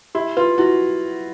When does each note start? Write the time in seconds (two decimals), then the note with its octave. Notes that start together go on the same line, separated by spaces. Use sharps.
0.15 E4 G4
0.37 F4 B4
0.58 E4 F#4